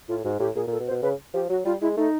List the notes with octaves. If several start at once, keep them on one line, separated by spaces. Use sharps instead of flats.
A2 F4
G#2 F#4
A2 G4
A#2 G#4
A#2
A4
B2
C5
B2
C#3 B4
F3 G4
F#3 F#4
G3 F4
G#3 E4
A3 D#4